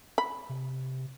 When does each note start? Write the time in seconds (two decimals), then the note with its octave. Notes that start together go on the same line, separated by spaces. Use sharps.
0.18 B5
0.49 C3